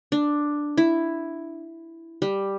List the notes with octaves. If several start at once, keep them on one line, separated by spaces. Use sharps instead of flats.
D4
E4
G3